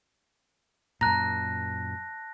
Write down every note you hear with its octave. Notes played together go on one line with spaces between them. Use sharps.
F#2 A#2 A5 A#5 F#6 A#6